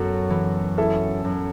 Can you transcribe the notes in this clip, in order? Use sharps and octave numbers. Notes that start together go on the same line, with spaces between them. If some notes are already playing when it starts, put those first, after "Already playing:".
Already playing: F#2 B3 F#4 A4
E3
C#4 E4 A4
F#2